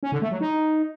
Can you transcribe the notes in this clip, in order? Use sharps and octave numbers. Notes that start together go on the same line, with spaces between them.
C#4
D3
A3
F#3
D#4